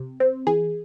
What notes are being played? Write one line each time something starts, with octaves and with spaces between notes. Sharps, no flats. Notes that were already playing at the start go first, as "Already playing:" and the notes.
Already playing: C3
C4
E3 G#4